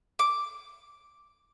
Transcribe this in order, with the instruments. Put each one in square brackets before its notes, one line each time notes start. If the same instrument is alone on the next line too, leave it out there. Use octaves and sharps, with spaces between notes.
[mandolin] D6